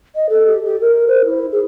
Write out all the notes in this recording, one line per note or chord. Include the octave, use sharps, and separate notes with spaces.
D#5
A4
G4
G4
A#4
C5
E4
G#4